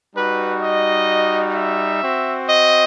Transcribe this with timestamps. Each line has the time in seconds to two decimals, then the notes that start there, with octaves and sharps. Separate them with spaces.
0.15 G3 D#4 F#4 B4
0.61 D#5
1.55 E5
2.02 C4 F#4
2.48 D#5